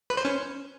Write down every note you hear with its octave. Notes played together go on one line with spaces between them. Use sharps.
B4
C5
C#4